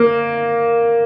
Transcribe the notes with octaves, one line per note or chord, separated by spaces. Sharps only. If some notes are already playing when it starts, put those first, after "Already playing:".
Already playing: A#3